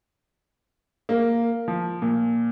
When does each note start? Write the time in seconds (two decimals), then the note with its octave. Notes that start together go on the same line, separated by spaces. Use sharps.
1.09 A#3
1.68 F3
2.02 A#2